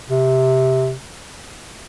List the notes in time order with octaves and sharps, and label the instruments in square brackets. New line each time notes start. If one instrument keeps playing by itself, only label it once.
[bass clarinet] C3